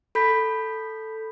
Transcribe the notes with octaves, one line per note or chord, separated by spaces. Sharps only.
A4 B5 G6 B6